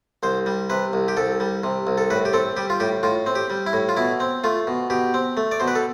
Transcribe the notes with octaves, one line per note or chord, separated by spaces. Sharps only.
C2 C5
G3
C3 B4
C2
G4
C2 A4
G3
C3
C2
A4
A2 B4
G4
C4 A4
G3 G4
F4
A2 G4
A2 F4
C4
G4
G3
E4
A2
F4
B2 E4
C4
A3 F4
B2
B2 G4
C4
A3
D5
B2 C5
B4
A4